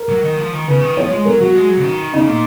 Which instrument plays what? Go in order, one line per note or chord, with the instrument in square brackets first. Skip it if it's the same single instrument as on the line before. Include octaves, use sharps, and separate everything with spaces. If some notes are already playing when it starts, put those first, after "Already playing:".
Already playing: [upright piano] A#4
[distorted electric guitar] F#3
D#3
F3
D#3
[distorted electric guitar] C#3 [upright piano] B4
[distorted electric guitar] D#3
[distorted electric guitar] F3 [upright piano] C#5
[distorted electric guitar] G#3
[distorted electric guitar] F#3 [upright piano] A#4
[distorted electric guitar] F#3 [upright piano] F#4
[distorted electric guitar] G#3
F#3
C#3
D#3
[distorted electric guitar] C#3 [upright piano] D#4
[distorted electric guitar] A#2